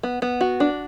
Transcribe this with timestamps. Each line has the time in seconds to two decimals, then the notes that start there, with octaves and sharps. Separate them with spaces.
0.03 B3
0.22 B3
0.41 F#4
0.60 D4